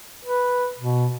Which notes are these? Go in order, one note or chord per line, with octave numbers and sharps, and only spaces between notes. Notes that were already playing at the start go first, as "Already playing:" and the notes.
B4
B2